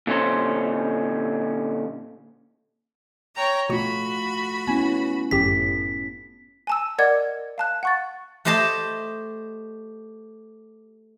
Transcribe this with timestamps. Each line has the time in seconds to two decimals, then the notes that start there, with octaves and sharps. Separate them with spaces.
0.07 A#2 D3 C#4 C5
3.35 C#5 G5 A#5
3.70 B2 A3 F4 F#4 B5 C#6
4.67 B3 C#4 E4 G#5
5.31 G1 F#2 A2 G4 B6
6.67 G#5 A5 E6
6.98 A#4 D5 D#5 F#5 D6 G#6
7.58 F5 A5 F#6
7.83 F#5 C#6 A6
8.45 A3 G4 C5 D#5 A5